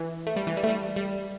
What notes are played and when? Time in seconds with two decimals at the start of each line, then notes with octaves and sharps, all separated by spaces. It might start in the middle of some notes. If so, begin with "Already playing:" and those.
Already playing: E3
0.27 A3
0.36 G3
0.47 E3
0.57 G3
0.64 A3
0.69 G3
0.96 G3